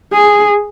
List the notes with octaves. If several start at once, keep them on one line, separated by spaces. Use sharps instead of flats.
G#4